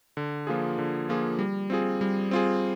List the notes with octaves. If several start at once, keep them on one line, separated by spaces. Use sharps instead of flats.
D3
F3 A#3 F4 G#4
D3
F3 A#3 F4 G#4
G3
C4 F4 G#4
G3
C4 F4 G#4